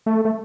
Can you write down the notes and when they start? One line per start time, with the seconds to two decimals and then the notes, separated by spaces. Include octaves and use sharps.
0.06 A3
0.25 A3